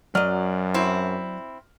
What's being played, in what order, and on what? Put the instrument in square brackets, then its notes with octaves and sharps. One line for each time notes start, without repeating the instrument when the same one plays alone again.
[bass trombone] F#2 [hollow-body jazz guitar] F#3 D#5 [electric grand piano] F#4 D5 F6
[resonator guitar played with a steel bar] C4 E4